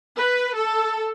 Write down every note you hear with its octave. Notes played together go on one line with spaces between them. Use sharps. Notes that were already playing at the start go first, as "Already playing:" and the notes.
B4
A4